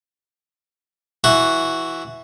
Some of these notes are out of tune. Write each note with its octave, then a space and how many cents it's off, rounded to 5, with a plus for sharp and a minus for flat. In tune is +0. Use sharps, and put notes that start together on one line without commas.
E3 +0 F#4 +0